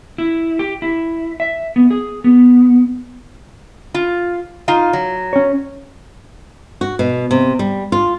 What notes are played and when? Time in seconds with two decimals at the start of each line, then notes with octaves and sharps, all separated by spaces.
0.18 E4
0.59 G4
0.82 E4
1.40 E5
1.76 B3
1.91 G#4
2.24 B3
3.94 F4
4.68 D#4 F4 F5
4.93 F#3
5.33 C#4 C#5
6.81 F#4
6.99 B2
7.31 C3
7.59 G3
7.92 F4